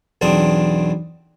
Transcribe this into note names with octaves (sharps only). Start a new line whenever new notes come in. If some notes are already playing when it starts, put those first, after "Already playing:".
B1 E2 C4 D4 A5 D#6